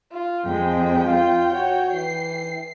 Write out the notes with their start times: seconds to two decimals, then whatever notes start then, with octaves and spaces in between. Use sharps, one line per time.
0.12 F4
0.46 F2 G#3 G5
1.05 F4
1.52 F#4 C#5
1.94 E3 C7